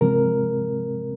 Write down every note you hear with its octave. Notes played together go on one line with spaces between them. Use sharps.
C3 F3 G#3 C4 A#4